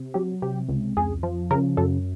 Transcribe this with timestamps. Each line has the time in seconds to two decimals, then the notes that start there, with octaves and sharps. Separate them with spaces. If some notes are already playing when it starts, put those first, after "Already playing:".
Already playing: C3
0.14 F#3 G4
0.42 C3 G4
0.68 C#2
0.97 F2 G#4
1.23 F3
1.51 C#3 A#4
1.77 F#2 A4